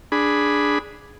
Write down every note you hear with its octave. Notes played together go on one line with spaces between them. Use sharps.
D4 G#4 B5